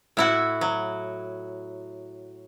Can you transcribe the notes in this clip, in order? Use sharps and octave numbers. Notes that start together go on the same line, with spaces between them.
A2 E4 F#4
F#3